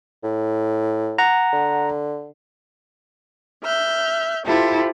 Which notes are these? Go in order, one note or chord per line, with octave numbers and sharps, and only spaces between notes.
A2
F#5 A#5
D3
E5 F6 G6
E4 F4 G4 A4 C5